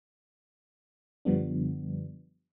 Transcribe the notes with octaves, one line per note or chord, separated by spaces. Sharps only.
F#2 D3 F3 G3 B3 D4